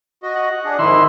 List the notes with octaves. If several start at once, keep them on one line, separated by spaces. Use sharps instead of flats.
F#4 D#5
F#5
D4 G#4
F2 G#2 D#3 E4 E5 C6